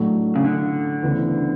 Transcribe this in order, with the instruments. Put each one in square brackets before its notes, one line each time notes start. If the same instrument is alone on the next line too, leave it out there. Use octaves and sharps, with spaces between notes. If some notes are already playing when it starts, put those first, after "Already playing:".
Already playing: [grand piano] A2 F#3 A3 D4
[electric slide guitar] C#3
D3
[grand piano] D2 C#3 E3 B3 D4